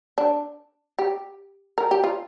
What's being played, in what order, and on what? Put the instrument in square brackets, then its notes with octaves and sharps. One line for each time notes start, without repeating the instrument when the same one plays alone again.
[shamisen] D4
G4
A#4
G4
F4